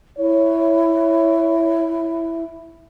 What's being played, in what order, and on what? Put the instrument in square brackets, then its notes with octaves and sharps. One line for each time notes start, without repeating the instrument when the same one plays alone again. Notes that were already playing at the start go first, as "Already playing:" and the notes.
[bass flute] E4 [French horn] C#5